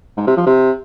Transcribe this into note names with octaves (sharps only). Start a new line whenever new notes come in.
G#2
C3
F3
C3